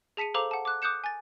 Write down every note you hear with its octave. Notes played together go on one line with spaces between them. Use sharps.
G#4 A5 B6 C#7 D#7
A4 C5 F5 A#5 D6 F7
F#5 A5
D6 F#6
D6 D#6 F#6 G6 C#7 E7
G#5 A6